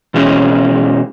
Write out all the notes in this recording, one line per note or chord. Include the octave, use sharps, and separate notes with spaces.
B2 E3 G#3 C#4